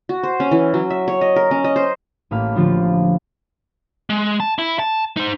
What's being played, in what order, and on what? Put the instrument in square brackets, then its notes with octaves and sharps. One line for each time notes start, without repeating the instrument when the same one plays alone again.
[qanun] F#4
C5
C#4
E3
F#3
E5
C#5
D#5
A#4
C#4
D#5
C5
[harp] A1 A2 A#3 F5 B5 F6
D3 F3 F4
[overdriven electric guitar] G#3
A5
E4
A5
D#4 C5